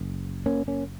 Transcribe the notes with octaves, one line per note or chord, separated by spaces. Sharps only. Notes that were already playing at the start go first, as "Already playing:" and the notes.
Already playing: F#1
A#3 C#4
A#3 C#4